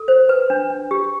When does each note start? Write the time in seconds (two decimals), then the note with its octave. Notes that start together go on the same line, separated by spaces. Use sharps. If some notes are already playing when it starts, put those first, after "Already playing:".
Already playing: A4
0.08 C5
0.29 B4
0.50 D4
0.70 D4
0.91 G4